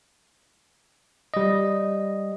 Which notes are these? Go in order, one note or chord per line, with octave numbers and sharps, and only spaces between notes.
G3 D#5